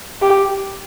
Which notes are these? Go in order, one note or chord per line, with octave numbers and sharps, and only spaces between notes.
G4